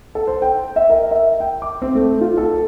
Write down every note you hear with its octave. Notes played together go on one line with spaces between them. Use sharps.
A4
C5
G5
E5
A#4
E5
G5
D6
C4
A3
F4
A4